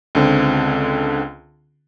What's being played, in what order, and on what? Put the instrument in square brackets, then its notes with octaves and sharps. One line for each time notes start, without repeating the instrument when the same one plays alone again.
[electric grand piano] C#2 D3 C4